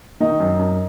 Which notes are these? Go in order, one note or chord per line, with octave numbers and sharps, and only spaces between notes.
D#3 D#4
F#2
F#2